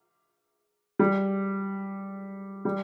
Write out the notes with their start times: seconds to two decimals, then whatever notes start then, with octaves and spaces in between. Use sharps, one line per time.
0.99 G3
2.65 G3